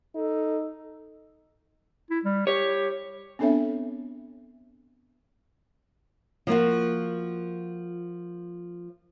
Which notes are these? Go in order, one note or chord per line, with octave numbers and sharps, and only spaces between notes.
D#4 A4
E4
G3
G4 C#5
B3 C4 D4 A4 C#5 E5
F3 A#3 F4 F#4